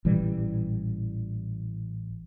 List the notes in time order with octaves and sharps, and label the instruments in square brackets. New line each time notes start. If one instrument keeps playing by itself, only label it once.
[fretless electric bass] A1 A#2 E3 G3